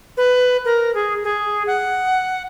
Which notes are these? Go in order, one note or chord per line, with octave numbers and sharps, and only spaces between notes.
B4
A#4
G#4
G#4
F#5